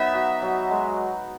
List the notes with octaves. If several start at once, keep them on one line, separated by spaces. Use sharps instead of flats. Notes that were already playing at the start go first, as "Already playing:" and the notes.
Already playing: F#3 B3 D#4 E5
F#4
F#3
G#3